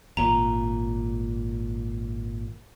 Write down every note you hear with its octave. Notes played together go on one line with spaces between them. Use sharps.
G#1 A#2 A#5